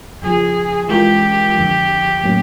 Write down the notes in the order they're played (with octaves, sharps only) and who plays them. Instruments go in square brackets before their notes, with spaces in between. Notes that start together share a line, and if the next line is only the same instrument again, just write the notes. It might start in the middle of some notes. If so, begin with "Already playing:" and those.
[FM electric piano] F2 C#3 F3 [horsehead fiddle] G#4
[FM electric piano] E3 G#3 C#4 F4 A#4 [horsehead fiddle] G4
[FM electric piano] F2 D3 F3
A2 F#3 A#3 C#4